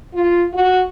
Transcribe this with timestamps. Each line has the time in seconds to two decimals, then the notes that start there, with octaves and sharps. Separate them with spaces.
0.13 F4
0.53 F#4